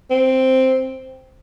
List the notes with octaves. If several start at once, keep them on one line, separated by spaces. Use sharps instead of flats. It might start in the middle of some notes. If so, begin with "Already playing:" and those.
C4